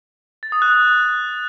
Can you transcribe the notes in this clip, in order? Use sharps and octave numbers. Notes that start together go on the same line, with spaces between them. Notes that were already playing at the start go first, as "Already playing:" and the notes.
A6
D#6
F#6